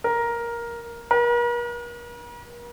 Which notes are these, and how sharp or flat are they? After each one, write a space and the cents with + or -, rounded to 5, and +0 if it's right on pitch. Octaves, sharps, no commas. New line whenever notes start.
A#4 +10
A#4 +45